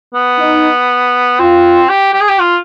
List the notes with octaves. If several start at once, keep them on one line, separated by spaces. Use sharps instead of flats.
B3
D#4
C4 F4
G4
G4
G#4
G4
F4